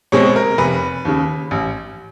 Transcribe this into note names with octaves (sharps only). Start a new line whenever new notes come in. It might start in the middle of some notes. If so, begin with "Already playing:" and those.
B2 G#3 C4 C#5
A#4
F1 B4
D#2 C#3
A1